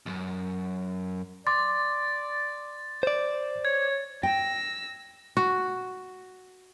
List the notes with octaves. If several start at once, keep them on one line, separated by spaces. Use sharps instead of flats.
C2 F#2
D5 C6 D6 A6
C5 D5
C#5 G#6
G5 E6 A#6
F#4